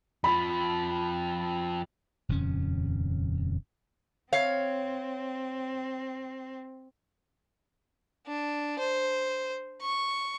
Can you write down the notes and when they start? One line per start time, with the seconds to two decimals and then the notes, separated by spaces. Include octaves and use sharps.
0.24 F2 F3 B5
2.29 D#1 F2 C#3 C#4
4.33 C4 C#5 F5
8.27 D4
8.79 C5
9.82 C#6